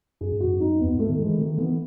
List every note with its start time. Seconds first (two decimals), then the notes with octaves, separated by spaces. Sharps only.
0.21 F#2 G#4
0.32 G#2
0.40 F#2 F#4
0.60 D#4
0.80 E2 B3
0.95 G#2 A3
1.09 D#3
1.19 G#3
1.24 E3
1.38 D#3 A3
1.58 E3 B3